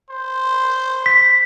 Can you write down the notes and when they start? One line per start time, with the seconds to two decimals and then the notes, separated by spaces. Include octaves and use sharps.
0.10 C5
1.06 B6